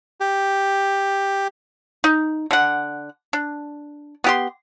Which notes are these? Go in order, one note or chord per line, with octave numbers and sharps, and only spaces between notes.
G4
D#4
D3 F#5
D4
B3 G4 C6